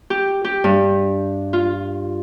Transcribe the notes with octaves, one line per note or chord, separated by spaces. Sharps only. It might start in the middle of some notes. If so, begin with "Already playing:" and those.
G4
G4
G2
F4